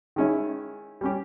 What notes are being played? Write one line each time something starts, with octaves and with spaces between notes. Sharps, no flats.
D#3 G#3 C#4 E4
G3 C#4 G4